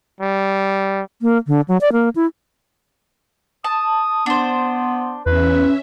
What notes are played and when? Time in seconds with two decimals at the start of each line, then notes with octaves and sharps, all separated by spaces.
0.20 G3
1.22 A#3
1.47 D3
1.68 F#3
1.81 D5
1.92 A#3
2.15 E4
3.64 A5 D#6
4.26 B3 D4 C5
5.26 E2 C#4 B4 E5